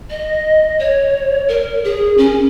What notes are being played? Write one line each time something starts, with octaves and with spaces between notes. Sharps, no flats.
D#5
C#5
A#4
G#4
C#4